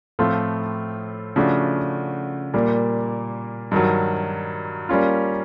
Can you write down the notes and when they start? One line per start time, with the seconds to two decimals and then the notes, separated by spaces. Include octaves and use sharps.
0.19 A2 F3 A3 C4 F4
1.36 C#3 F3 A3 D4 F#4
2.54 A#2 G3 A#3
3.71 G2 D#3 F#3
4.89 G3 A#3 C#4 F4